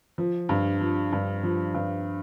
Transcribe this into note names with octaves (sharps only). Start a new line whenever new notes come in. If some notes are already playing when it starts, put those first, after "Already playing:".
F3
G2
F3
G2
F3
G2